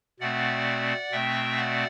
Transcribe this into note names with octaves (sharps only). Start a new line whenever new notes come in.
B2 A3 C4 D5 F#5
B2 A3 C4 E5 G5
D5 F#5